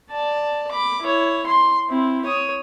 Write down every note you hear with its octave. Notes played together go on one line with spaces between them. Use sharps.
D5 A5
B5 D6
E4 C#5
C6
C4 E4
C#5 D#6